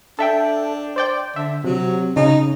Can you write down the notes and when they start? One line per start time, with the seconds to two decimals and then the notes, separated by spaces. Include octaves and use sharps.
0.19 D4 A4 E5 G5
0.96 C5 D5 G5
1.36 D3 E5
1.64 C3 F#3
2.16 C#3 D#4